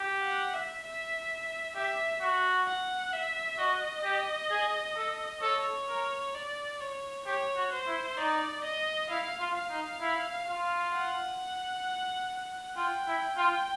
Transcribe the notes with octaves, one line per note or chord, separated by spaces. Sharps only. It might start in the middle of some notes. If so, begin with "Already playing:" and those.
Already playing: G4
F#5
E5
E5
G4 E5
F#4
F#5
E5
F#4 D#5
G4
G#4
A4
A4 C#5
A#4
D5
C#5
G4 C#5
F#4
C5
E4
D#4 D5
D#5
E4 F5
F4
F5
D#4
E4
F4
F#5
F4 G5
E4
F4